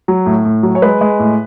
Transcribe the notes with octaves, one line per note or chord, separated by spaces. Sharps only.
F#3
A2
A2
F#3
C#5
G#3 B4
G#3
A2